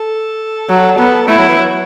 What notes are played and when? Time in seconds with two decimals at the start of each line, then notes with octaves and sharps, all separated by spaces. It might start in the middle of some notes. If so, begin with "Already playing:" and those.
Already playing: A4
0.69 F#3
0.98 B3
1.28 A3 E4
1.38 F#3
1.48 E3
1.58 F#3